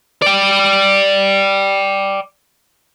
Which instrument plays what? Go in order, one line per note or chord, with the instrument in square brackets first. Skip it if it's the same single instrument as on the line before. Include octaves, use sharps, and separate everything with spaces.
[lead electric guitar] D5 G5